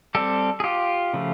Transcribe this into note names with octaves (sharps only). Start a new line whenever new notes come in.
G3 C4 G4 A4
G#4
F4 G4
C#3 F3 A3